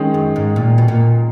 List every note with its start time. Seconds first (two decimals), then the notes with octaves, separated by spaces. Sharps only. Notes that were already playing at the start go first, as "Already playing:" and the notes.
Already playing: D#3 G#3 C#4
0.14 F#2
0.36 G#2
0.56 A#2
0.78 B2
0.88 A#2